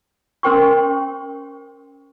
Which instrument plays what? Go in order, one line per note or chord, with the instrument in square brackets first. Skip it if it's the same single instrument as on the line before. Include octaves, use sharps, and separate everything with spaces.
[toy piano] C#4 A#4 C5 G5 C6 C#6